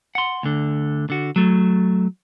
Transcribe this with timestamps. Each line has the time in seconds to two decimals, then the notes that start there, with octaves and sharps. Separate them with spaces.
0.15 F#5 C6
0.43 D2 D3
1.10 D3 F#4
1.36 F#3 A3